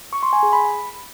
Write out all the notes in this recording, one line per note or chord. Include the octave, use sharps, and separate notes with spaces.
C#6
C6
G#5
G#4
B5